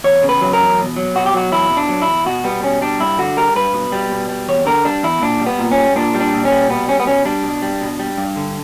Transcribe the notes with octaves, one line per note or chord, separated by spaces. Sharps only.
E2 C#5
C#3
B4
F#3
A#4
E2
B2
F#3
B2 F#4
G4
F#3 F#4
E2 E4
B2
D4
F#3
E4
E2
B2 F#4
G3 B3
B2 C#4
G3 D4
G2 E4
D3 F#4
G3 A#4
G2 B4
B2
G3
B2
G3
E2 C#5
D3 A#4
G3 D4
E2 E4
A#2 D4
G3
B3
A#2
C#4
G3
A#2 D4
G3
D4
A#2
C#4
G3
B2 B3
G3 C#4
B3
B2 C#4
G3 D4
B2
G3
B2
G3
G2
D3